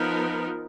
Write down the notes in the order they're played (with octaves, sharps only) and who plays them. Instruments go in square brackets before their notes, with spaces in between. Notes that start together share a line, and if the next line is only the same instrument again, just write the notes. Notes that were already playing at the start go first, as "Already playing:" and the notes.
Already playing: [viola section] F3 B3 D#4 A#4